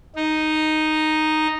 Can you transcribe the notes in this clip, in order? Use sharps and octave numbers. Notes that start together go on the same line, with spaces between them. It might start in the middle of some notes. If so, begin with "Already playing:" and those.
D#4